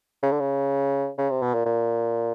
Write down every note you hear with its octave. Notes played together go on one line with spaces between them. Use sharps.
C#3
D3
C#3
C#3
C3
B2
A#2
A#2